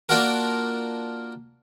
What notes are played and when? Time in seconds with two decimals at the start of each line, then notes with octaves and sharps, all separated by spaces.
0.09 A#3 D4 F4 F#4 A#4